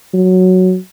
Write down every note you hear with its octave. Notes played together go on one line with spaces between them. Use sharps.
F#3